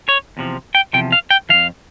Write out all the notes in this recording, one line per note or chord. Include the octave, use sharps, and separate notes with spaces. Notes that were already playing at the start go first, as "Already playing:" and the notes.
C#5
E2 C3 F3
G5
E2 C3 F3 G5
F5
G5
F2 E3 F5